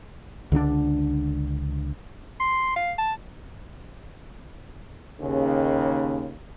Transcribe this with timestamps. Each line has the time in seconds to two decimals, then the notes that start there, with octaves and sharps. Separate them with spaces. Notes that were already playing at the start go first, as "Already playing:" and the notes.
0.52 C#2 D3 C4 D4
2.40 C6
2.76 F5
2.98 A5
5.21 D#2 C#3